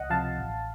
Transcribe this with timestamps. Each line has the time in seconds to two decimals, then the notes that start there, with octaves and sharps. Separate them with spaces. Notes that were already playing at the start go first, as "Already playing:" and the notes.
Already playing: C#2 D#5 F#5
0.10 C3 F3 F5 A5
0.38 A1